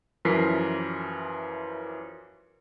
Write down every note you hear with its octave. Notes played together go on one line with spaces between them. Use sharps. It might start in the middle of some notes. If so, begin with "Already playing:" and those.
F#2 E3 F3 A#4 B6 C7